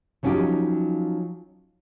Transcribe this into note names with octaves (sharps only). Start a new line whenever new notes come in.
F3 F#3 C#4 D#4 F4 G4